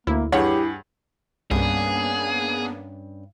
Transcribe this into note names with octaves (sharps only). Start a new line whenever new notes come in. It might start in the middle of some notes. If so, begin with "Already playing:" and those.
D2 A#3 E4
G2 E4 G4 G#4 C#5 F#5
C2 G2 A#3 B3 C#4 D4 G#4